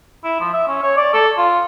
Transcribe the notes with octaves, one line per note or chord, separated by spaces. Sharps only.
E4
F3
E5
C#4
C#5
D5
A4
F4